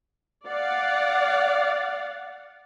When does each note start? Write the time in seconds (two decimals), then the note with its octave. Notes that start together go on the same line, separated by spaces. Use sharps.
0.47 D5 F5 F#5